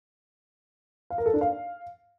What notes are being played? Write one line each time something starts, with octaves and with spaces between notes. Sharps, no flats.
F5
A#4
A4
D4
F5